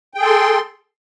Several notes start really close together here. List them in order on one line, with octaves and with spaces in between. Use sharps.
G5 G#4 A4 C6